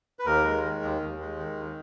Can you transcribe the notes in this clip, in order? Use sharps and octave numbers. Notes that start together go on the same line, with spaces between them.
B4
D#2 A#4
G#3
D#3
D#2
D#2
G#3
D#3
D#2